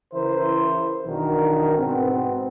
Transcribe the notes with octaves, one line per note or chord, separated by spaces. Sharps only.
C#3 E3 E4 A#4 C5
B1 D#3 E3 D4 F#4 A#4
G#2 B2 B3 C4